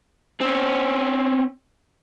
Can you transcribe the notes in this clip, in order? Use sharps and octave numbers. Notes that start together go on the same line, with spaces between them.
C4 C#4